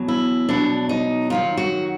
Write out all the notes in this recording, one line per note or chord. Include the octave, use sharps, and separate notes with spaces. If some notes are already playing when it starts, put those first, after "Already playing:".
Already playing: E2 B2 F#3
E4
E2 B2 F#3 D4
D#4
F#2 D#3 F#3 F4
F#4